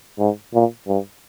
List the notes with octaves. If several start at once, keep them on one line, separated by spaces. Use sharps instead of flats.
G#2
A#2
G2